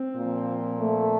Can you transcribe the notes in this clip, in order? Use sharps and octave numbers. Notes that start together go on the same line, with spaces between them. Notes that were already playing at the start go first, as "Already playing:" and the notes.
Already playing: C4
A#2 F3
A3